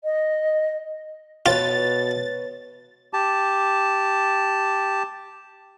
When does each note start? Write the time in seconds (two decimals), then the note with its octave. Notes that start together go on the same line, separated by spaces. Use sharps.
0.04 D#5
1.46 B2 F4 B4 C#5 A5 A6
3.13 G4 A5